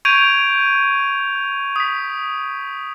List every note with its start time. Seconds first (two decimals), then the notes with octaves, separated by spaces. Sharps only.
0.05 C#6 G6 G#6 D7 D#7 F7
1.76 D#6 B6